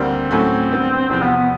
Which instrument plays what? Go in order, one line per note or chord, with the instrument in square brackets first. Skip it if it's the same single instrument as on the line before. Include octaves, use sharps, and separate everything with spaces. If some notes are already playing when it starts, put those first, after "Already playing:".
Already playing: [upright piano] D2 D3 G3 A#3 [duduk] C4
[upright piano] A2 F#3 A3 C#4 F#4 [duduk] C4
[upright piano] D3 G3 B3 D4
[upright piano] E2 C3 F3 [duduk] C4
[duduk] B3
B3